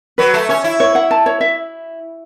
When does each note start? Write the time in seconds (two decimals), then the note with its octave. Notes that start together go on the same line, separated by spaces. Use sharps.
0.18 F#3 B4
0.34 A3
0.49 C#4 C#5
0.64 E4
0.80 C#5
0.95 F#5
1.11 A5
1.26 C#5
1.41 E5